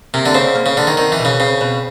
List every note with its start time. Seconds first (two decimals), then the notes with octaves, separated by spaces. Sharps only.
0.14 C3 A#3
0.26 D3
0.34 C#3 C5
0.55 A#3
0.66 C#3
0.77 D3 A#3
0.87 D#3
0.97 D#3 C4
1.12 E3
1.19 B2
1.25 C#3
1.40 C#3 C4
1.61 B2